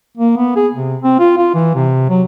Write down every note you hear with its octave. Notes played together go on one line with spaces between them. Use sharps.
A#3
B3
G#4
C3
C4
F4
F4
E3
C3
F#3